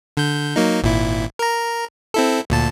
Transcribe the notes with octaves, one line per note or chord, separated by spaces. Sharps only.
D3 G6
F#3 A#3 D#4
G#1 A#2 E4
A#4 A#5
C4 E4 A4
D2 A#2 A5